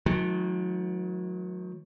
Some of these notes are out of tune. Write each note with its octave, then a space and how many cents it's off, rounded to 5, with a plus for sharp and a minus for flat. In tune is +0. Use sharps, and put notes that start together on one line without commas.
D#3 +35 F#3 -30 A3 -45